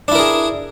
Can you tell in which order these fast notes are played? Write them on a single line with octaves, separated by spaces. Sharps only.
D4 E4 A#4 G#4